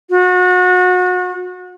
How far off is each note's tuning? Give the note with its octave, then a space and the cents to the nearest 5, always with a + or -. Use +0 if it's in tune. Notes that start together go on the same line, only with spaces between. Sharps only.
F#4 -30